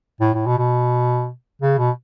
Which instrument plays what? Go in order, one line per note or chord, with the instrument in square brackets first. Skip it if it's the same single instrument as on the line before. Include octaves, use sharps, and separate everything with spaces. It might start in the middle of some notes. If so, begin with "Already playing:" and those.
[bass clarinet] A2
A2
B2
B2
C#3
B2